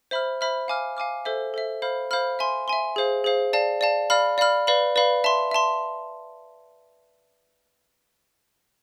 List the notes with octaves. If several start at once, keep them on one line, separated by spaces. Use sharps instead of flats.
C5 E5 B5 F6
C5 E5 B5 F6
F5 G#5 D6 F6
F5 G#5 D6 F6
A4 C5 E5
A4 C5 E5
C5 F5 B5 F6
C5 F5 B5 F6
E5 G#5 C6
E5 G#5 C6
G#4 C5 F5
G#4 C5 F5
D5 F5 A5
D5 F5 A5
D5 F5 B5 F6
D5 F5 B5 F6
B4 D5 F5 B5
B4 D5 F5 B5
E5 A5 C6
E5 A5 C6